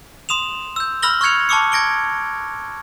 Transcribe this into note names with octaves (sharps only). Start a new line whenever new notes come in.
C6 D#6 E7 F7
E6 G6
B5 E6 F6 A#6 F#7 G7
C#6 F6 F#6 G#6 C#7 F7
A5 B5 C#6 D6 E6 C#7
G#6 A#6 D7 G7